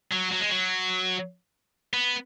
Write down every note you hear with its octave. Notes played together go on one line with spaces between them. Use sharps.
F#3
F#3
G#3
F#3
B3